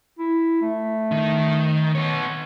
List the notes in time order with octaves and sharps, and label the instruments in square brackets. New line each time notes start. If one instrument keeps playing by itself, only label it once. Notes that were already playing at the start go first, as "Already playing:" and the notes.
[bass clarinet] E4
A3
[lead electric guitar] D#3
B3 C#5